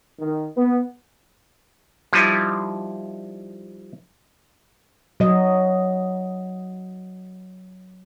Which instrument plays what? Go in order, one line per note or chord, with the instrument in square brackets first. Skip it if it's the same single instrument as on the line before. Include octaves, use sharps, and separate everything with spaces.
[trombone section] D#3
B3
[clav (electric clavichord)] F3 G3 D#4 E4
[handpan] F#3 D#5